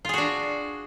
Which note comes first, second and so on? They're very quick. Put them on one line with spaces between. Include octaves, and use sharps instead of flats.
F4 G#4 F#4 D4